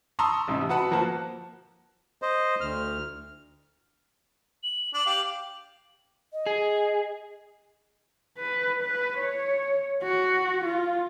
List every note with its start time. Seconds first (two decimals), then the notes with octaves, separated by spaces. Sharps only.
0.19 A5 A#5 C6 C#6 D#6 E6
0.48 A1 G#2 C3 E5
0.69 F#4 B4 F#5 A5 B5
0.91 F3 A#3 F#4 A5 F#6
2.22 C5 D#5
2.61 D2 F6
4.63 F#7
4.94 D4 F#7
5.06 G4 F5
6.32 D#5
6.46 G#4
8.38 B4
8.83 B4
9.18 C#5
10.03 F#4
10.64 F4